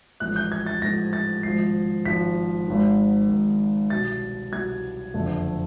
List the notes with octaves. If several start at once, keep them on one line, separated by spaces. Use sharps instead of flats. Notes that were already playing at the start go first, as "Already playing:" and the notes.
A1 G#2 F3 A3 F#6
G6
G#6
A6
A1 G#2 F3 A3 A#6
A6
G#1 G#2 F3 C7
G#1 G#2 F3 B6
G#1 G#2 D#3
G#1 G#2 D#3
C2 B2 F#3 A6
C2 B2 F#3 G#6
F#1 F2 D3 F3 A3